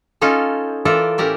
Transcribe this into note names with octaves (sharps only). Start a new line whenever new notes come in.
C#4 D#4 F4 A4
E3 F4 A4 A#4 D5 E5
A2 C#4 G4 A#4 D5 E5